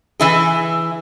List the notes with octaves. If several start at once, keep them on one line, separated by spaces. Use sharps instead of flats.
E3 E4 G#4